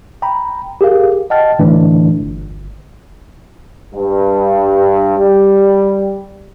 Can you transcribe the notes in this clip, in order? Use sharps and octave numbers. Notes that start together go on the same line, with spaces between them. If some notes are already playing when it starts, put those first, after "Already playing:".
G5 A#5 B5
G4 G#4 A#4 F5
D#5 F#5 G5 A5 F6 A6
A2 D3 E3 A3 D4
G1
G2
G3